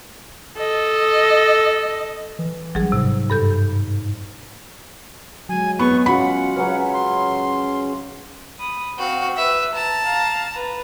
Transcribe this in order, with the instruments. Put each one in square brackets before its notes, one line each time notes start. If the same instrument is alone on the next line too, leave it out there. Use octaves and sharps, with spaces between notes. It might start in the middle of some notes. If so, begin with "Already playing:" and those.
[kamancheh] A4 D#5
[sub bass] E3
[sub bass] A1 [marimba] F#3 G3 G#4
[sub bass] G#2 [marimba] C3
[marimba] G2 A4 G6
[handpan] F#3 G#3 [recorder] G#5
[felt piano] B3 [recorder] C#6
[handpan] C#4 F4 F#4 [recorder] F#5 [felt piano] B5
[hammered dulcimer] C#3 F#3 C#4 [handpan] B4
[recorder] C6
[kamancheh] B5 D#6
[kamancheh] C4 F5 [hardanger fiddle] F#4
[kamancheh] B4 [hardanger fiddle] E5
[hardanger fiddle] A5 [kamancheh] A#5
[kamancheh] F5 A#5
B4 A#5